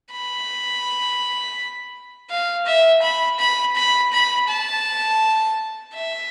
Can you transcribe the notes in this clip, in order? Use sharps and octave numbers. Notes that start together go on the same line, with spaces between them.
B5
F5
E5
B5
B5
B5
B5
A5
E5